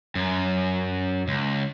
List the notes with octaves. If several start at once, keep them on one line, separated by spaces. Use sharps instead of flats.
F#2
C#2